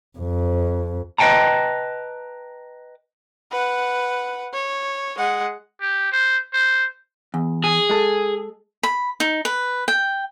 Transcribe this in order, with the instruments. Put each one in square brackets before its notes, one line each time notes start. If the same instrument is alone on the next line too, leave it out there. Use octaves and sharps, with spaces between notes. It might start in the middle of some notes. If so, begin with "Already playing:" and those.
[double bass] F2
[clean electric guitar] B4 D#5 F5 G5 A5 A#5
[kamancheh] B4 F#5
C#5
G#3 F#5
[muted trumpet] G4
C5
C5
[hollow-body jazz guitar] E2
[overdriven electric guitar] G#4
[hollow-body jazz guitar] G#3 A4
[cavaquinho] B5
D#4
B4
G5